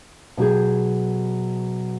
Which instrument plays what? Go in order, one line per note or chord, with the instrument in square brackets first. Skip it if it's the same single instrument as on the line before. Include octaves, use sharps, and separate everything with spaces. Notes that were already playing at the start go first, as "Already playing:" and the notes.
[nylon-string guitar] B2 F#3 G4 G#4